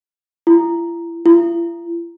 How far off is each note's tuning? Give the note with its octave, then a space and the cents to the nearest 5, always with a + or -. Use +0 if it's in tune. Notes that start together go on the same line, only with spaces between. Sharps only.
E4 +40
E4 +45